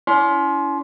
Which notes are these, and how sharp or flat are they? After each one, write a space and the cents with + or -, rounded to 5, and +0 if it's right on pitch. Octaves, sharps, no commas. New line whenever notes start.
C#4 +40 E4 +10 C6 +0